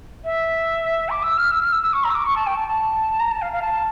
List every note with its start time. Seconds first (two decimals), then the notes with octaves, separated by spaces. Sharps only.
0.24 E5
1.09 D6
1.23 E6
1.38 F6
1.51 E6
1.61 F6
1.72 E6
1.82 E6
1.93 C#6
2.04 A#5
2.10 E6
2.14 D6
2.25 C#6
2.36 A5
2.46 G5
2.57 A5
2.68 A5
3.20 A#5
3.31 A5
3.42 F5
3.52 F5
3.62 A5